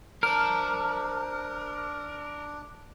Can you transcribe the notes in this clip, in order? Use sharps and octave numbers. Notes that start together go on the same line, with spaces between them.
D4 A#4 C5 A5 F6